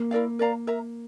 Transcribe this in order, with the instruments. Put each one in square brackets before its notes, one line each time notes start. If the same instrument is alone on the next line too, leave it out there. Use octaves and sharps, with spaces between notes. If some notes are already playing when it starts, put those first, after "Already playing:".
Already playing: [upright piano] A#3
[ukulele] E4 A#4 D5 F5
A#4 D5 F5 A#5
A#4 E5 A#5